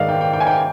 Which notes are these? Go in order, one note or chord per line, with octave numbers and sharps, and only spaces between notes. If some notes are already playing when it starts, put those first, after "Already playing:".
Already playing: G#2 D#3 D5 D#5 F5
G5
G5
G5
G#5
G5